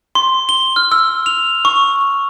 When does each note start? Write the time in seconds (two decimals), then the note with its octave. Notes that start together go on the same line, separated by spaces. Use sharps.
0.15 C6
0.49 G7
0.76 F6
0.92 E6
1.26 F7
1.65 C#6